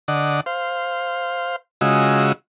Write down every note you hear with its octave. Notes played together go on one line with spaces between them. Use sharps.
D3 D5 D#5 F#5
C5 F5
C#3 G#3 F4 F#4 D#5 E6